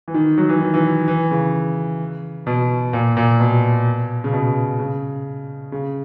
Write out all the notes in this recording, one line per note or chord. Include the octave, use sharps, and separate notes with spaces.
E3
D#3
F#3
E3
D#3
E3
E3
C#3
B2
A#2
A#2
B2
C#3
B2
C#3
C#3